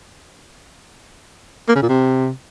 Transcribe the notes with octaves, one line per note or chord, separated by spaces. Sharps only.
A#3
C#3
A#2
C3